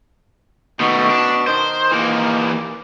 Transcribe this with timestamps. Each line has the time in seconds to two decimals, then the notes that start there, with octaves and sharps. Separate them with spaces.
0.80 B2 D#3 A3
1.10 D4
1.47 D#3 C5
1.92 E3 A#3